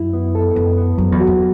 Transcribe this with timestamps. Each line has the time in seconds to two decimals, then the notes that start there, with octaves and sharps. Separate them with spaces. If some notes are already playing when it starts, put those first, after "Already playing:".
Already playing: F#2 E4
0.13 B3
0.35 A4
0.55 F#2 B3
0.78 B3
0.98 F#2 F#3
1.12 E2
1.20 F#4
1.27 E2